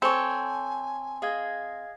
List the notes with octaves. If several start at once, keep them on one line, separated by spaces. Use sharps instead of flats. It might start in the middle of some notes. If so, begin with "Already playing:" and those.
C4 A4 C#5 G#5
G#4 D#5 F5 G#6